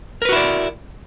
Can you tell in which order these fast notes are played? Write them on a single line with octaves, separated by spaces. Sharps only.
A#4 B4 F#4 E4 D5